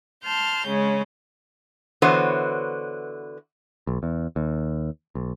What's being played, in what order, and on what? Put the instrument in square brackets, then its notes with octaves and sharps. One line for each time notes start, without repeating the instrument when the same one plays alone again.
[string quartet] A5 C6 F6 G6
C#3 G#3 C#4
[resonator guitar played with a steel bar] D3 E3 B3 F#4 C5 C#5
[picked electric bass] B1
E2
D#2
B1